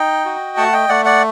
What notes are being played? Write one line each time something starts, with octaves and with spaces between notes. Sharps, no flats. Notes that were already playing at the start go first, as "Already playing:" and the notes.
Already playing: D#4 D#5 G5
F#4
A3 F#5 A5
D#5 G5
A3 D5 F#5
D5 F#5